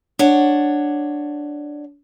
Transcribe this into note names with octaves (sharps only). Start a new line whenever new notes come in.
D4 C#5 F#5